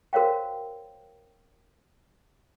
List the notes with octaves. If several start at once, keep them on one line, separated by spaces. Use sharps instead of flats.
F#4 A#4 C5 C#5 F5 G5